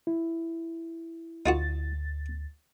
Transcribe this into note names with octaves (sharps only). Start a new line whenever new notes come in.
E4
D2 D#4 F4 F#4 A6